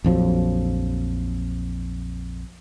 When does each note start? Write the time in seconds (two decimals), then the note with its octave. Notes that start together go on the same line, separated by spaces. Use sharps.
0.04 A#1 F2 F3 F#3